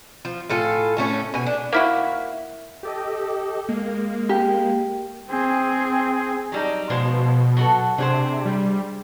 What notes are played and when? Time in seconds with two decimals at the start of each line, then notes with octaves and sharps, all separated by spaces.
0.25 F3
0.50 A2 F4 A4 G#5
0.97 A2 A3 C#4 C#5
1.34 B2 G#5
1.46 D4
1.73 A#3 E4 F#4
2.83 G4 A4 D#5
3.69 G#3 A#3
4.29 G4
5.29 C4 G#4
6.52 F#3 G3 D#4
6.90 B2 F3 G#3 C5
7.57 F#3 F#4 A4
7.98 C3 D4 G#4 C5
8.45 G3